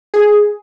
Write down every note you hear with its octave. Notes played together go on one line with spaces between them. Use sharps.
G#4